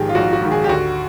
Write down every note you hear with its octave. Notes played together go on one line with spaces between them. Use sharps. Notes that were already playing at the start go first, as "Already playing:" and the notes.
Already playing: A#1 G#2 D#3 G4 G#4
F4
A#1 F#4
F#4
G#2 D#3
G#4
G4
D2 F#4